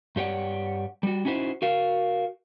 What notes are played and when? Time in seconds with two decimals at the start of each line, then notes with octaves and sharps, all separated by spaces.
0.16 G2 G4 C#5 D5 F#5
1.03 G3 F#4
1.25 C#4 D#4 E4 F#4 C5
1.62 F#4 A#4 F5